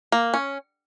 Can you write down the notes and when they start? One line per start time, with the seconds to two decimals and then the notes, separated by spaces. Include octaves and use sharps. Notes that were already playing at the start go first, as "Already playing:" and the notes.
0.12 A#3
0.34 C#4